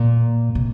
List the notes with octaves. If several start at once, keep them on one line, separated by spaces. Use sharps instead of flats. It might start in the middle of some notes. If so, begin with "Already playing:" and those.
Already playing: A#2
C3